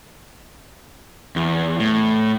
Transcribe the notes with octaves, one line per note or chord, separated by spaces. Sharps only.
E2
A2